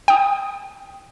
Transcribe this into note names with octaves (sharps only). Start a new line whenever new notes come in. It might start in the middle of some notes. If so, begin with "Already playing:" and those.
G5 D#6